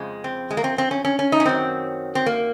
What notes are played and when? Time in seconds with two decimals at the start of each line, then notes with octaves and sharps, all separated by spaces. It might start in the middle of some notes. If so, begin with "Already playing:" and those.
Already playing: F2 C#3 F3 G#3
0.24 C4
0.51 G#3
0.57 A#3
0.64 C4
0.78 C4
0.91 C#4
1.05 C#4
1.19 C#4
1.32 D#4
1.40 C#4
1.45 F#2 D#3 F#3 C4
2.15 C4
2.26 A#3